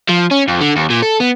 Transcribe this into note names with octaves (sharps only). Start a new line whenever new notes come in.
F3
C#4
F2
D3
D#2
A#2
A4
B3